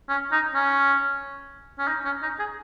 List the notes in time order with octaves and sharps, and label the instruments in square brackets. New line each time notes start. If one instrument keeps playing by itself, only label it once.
[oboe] C#4
D#4
C#4
C#4
D#4
C#4
D#4
G#4